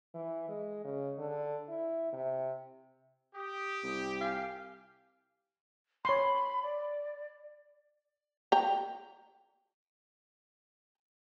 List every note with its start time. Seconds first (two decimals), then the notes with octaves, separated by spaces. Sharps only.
0.14 E3
0.49 G#3
0.85 C#3
1.18 D3
1.68 E4
2.13 C3
3.35 G4 D#6
3.83 C2
4.21 F5 G#5
6.05 C#5 B5 C6
6.62 D5
8.52 G5 A#5